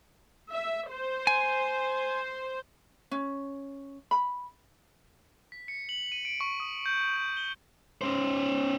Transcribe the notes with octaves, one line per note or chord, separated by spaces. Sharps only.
E5
C5
G#5
C#4
B5
B6
C#7
F#7
D#7
D7
C#6
D#6
G6
G6
G7
C#4 C5